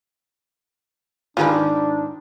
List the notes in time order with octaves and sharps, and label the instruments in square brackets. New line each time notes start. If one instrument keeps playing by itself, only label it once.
[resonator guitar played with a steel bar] G#2 D#3 [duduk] D4 [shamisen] F4 G#4 B4